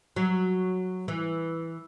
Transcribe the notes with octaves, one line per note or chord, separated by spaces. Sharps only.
F#3
E3